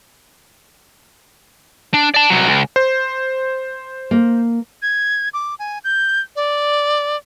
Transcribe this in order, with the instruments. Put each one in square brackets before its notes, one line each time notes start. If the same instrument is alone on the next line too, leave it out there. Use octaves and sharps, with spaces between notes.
[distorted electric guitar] D4
D5 A5
C2 F#3
C#2
[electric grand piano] C5
[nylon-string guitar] A#3
[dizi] G#6
D6
G#5
G6
D5